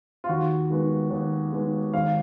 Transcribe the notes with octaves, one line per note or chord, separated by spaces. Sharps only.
F4
D#2 F#4
D#3 G#3 B3
D#2
D#3 G#3 B3
G#1 F5